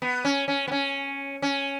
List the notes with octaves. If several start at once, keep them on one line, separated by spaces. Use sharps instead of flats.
B3
C#4
C#4
B3
C#4
C#4